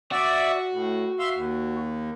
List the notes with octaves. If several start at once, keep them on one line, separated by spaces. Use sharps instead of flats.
F#4 D5 E5
A2
E5 F5 C6
D#2